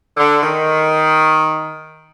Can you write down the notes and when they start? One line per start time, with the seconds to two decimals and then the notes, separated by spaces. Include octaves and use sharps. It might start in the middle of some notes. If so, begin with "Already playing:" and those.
0.17 D3
0.43 D#3